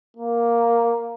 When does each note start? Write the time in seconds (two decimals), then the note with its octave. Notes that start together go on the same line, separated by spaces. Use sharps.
0.17 A#3